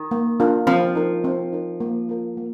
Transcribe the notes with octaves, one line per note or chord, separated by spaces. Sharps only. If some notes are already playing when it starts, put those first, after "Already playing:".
Already playing: D#3
A#3
D4 F4 A#4
F3 C4
D#4 A#4
C4
D#4 A#4
A#3
F4 A#4
A#3